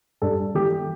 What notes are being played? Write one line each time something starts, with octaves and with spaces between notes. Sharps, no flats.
G2 A4
E3 G4